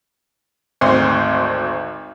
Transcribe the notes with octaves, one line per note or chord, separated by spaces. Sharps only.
G#1 D2 C4 C6